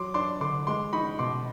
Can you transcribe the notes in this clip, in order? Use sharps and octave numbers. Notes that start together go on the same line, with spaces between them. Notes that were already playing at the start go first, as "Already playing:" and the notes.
Already playing: F#3 C6 D6
D4 C6 D6
D3 C6 D6
G#3 C6 D6
D#4 B5 C#6
B2 C6 D6